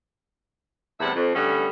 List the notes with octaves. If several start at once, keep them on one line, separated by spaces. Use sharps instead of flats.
E2 A2 C3 G3 E5 F#5
F2
D3 E3 G3 A3 B3 C#4